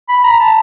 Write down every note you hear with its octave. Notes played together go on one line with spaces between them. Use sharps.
B5
A#5
A5